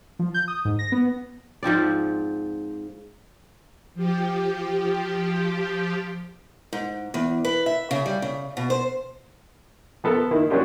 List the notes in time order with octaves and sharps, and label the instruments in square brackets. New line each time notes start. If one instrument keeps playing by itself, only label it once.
[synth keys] F3
G6
D#6
G#2
A#6
B3
[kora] G#2 F3 C4 D5
[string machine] F3 G4
[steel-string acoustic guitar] G#2
E2
B4
E5
C#3
G3
C#3
B2
C5
[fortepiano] F3 B3 A4 A#4
D#3 A#3 E4
F#3 A#3 C#4 D4 F4 G4